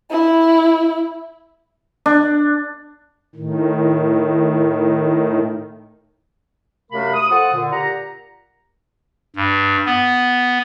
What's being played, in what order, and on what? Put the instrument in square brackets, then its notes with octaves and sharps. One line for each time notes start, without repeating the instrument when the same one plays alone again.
[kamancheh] E4
[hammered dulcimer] D4
[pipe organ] A2 D#3
[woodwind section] F#2 C3 A3 A#4 F5 B5
D#6
F3 F4 A4 F#5 D#6
A#2 D3
A#2 G4 F#5 A#5
[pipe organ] G2
B3